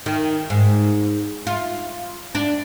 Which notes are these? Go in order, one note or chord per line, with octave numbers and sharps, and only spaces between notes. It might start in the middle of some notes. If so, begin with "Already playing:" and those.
D#3
G#2
F4
D4